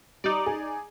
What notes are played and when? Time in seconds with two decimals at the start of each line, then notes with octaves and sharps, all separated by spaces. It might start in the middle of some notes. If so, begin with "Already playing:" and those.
0.24 G3 D#4 D5
0.46 G#4